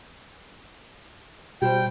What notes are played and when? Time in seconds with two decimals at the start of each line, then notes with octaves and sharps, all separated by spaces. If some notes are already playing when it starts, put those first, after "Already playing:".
1.62 B2 G3 C5 G5